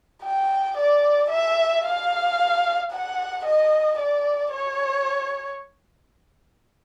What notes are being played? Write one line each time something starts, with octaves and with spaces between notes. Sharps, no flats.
G5
D5
E5
F5
F#5
D#5
D5
C#5